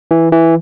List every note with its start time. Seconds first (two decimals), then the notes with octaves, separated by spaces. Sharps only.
0.11 E3
0.32 E3